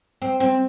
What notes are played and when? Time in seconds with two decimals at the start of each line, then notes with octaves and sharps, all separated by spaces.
0.22 C4
0.40 C4